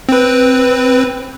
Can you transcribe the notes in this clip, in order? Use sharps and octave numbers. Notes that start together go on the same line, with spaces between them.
C4 B4